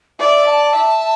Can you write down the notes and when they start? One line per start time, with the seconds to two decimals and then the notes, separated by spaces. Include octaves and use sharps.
0.19 D5 E5
0.46 A5
0.74 E5